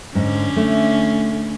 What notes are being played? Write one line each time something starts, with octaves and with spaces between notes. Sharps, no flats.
G#2 D3 C#4
A3